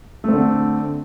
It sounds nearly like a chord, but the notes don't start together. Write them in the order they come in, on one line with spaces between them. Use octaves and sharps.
A3 C4 D3